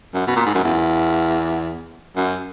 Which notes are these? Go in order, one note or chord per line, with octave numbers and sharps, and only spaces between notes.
F#2
B2
A#2
G#2
F#2
E2
F#2